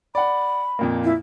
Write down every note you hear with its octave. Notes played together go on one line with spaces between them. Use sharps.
D5 F#5 B5
F2 A#2 A#3
E4